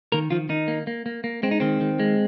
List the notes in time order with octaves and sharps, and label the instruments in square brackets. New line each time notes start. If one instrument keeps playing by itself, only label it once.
[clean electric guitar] D#3 A#3 A#4
D#3 F3 F4
D#3 D#4
A#3
A#3
A#3
A#3
G#3 C4
D#4
D#3 C4
D#3
G#3